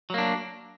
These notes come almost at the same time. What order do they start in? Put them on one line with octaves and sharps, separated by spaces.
F#3 A#3 D4